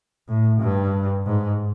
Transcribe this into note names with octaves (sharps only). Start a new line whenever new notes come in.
A2
G2
G#2